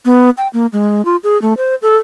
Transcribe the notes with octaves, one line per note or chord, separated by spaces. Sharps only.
B3
G5
A#3
G#3
F4
G#4
A3
C5
A4